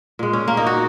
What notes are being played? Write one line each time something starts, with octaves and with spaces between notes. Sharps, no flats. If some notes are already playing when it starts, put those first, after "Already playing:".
A#2 G#3
C#4
A#3
D#4
F#4